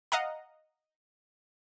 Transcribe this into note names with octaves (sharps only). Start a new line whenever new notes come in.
D#5 F5 F#5 A#5